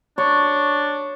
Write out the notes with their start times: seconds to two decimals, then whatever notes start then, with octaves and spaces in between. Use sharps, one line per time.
0.18 D4 C#5